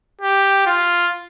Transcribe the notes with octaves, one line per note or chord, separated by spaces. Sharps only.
G4
F4